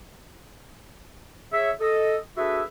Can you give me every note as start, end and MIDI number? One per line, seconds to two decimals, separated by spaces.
1.52 1.71 68
1.52 1.71 73
1.52 1.71 76
1.80 2.16 69
1.80 2.16 75
2.37 2.63 62
2.37 2.63 66
2.37 2.63 68
2.37 2.63 69
2.37 2.63 71
2.37 2.63 76